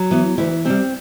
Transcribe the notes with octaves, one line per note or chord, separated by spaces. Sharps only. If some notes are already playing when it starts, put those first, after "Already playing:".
Already playing: F#3
E3 B3
D2 E3 E4
C3 G3 C4